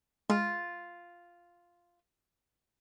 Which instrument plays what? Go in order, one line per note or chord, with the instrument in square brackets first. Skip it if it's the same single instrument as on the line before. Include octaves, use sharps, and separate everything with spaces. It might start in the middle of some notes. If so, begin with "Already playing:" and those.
[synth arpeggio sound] G#3 [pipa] F4